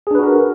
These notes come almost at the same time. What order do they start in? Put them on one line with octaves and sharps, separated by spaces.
G#4 D4 B4 F#4 A#4